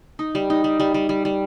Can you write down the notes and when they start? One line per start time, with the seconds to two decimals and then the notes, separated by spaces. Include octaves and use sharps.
0.19 D#4
0.35 G3
0.50 D#4
0.64 G3
0.80 G3
0.94 G3
1.09 G3
1.25 G3